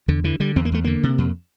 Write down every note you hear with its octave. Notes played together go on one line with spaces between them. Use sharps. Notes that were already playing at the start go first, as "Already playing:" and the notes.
E2 D3
D3 E3
D3 G3
E2 C4
A#3
E2 A3
D3 A#3
C3
F2